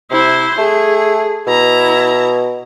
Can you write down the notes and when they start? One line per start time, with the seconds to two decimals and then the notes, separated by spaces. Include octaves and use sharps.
0.11 C3 E4 C5
0.58 A3 G#4
1.47 B2 E4 A#5